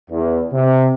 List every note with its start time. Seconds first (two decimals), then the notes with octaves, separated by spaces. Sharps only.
0.11 E2
0.53 C3